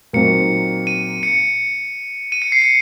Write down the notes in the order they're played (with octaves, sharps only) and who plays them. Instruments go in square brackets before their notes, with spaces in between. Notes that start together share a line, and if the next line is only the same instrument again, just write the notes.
[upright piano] A#2 F#3 C4 D#4 [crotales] C#7
[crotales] D#7
C#7
D#7
C#7
C7
C#7